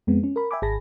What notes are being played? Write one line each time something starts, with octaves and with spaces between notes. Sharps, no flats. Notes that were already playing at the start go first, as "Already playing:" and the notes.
F2 G#3 B3 C4
C#4
A#4 B5
E5 G5 G#5 B5 D6
G#1 G#4 G#5 A5 B5 A#6